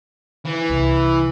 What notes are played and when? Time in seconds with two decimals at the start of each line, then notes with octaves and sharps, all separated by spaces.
0.46 E3
0.69 C2